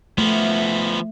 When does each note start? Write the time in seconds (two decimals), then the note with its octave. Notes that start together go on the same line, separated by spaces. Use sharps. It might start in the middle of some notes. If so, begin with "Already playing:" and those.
0.18 F3 A3 B3